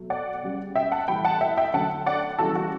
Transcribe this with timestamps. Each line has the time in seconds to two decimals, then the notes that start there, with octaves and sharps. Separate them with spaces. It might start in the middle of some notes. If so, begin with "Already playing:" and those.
Already playing: B2 F#3 A3
0.10 D5 F#5
0.43 C#3 G3
0.75 E5 G5
0.92 F#5 A5
1.08 A2 E3 G3 G5 B5
1.25 F#5 A5
1.41 E5 G5
1.57 E5 G5
1.74 D3 F#3 A3 F#5 A5
2.06 D5 F#5
2.39 C#3 E3 G3 F#4 A4
2.55 F#4